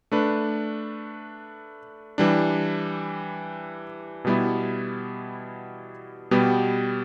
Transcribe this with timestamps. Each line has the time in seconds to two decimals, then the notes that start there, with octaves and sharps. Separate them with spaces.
0.12 A3 D4 B4
2.18 E3 G3 D4
4.25 B2 G3 B3 E4
6.31 B2 G3 B3 G4